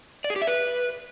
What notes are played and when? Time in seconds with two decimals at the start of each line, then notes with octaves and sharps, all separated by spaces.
0.24 D5
0.30 G#4
0.36 G4
0.42 E5
0.47 B4